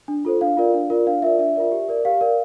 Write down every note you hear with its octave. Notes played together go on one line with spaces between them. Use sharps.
D4
F4 A4 C5
D4 F5
F4 A#4 D5
D4
F4 A#4 D5
D4 F5
F4 A#4 D5 E5
D4 E5
F4 A#4 D5
G4
A#4 D5
G4 F5
A#4 D5